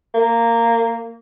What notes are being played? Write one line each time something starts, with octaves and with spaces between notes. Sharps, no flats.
A#3